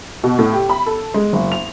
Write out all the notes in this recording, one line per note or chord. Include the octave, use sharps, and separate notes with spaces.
B2
A2
G4
B5
A4
G#3
F#1
F7